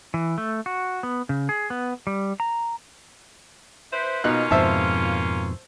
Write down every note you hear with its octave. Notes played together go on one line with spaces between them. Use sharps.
E3
A3
F#4
B3
C#3
G#4
B3
G3
A#5
E4 B4 C5
B2 A#3 C#4 D#4 F4 F#6
F2 G#2 B2 C5 E5 A5